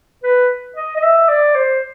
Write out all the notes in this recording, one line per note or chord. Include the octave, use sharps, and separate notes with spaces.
B4
D#5
D#5
E5
D5
C5